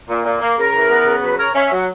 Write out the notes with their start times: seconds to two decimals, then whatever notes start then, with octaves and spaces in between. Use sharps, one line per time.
0.08 A#2
0.24 A#2
0.40 A#3
0.57 C#3 A#4
0.74 E3
0.89 B3
1.06 C#3
1.22 F#3 B4
1.38 A#4 C#5
1.54 C#4 E5
1.65 E5
1.71 F#3 F#5